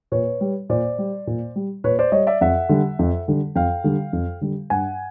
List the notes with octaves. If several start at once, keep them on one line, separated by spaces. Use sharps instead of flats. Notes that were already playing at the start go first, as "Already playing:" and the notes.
A#2 B4 C#5
G3
A#2 C5 D5
G3
A#2
G3
A#2 B4 C#5
C5 D5
G3 C#5 D#5
D5 E5
F2 E5 F#5
D3 G3
F2
D3 G3
F2 F5 G5
D3 G3
F2
D3 G3
G2 F#5 G#5